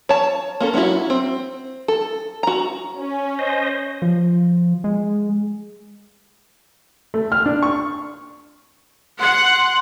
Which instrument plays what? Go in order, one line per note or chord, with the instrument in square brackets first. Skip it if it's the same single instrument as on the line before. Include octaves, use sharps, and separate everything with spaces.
[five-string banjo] C#5 A5
A#3 C#4 A4
F#3 C#4 D#4 E4 F#4
C4
A4
F#4 A#5
[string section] C#4
[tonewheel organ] C5 D#5
[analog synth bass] F3
G#3
[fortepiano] A3
F6
D4
C#6
[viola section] F#5 [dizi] C6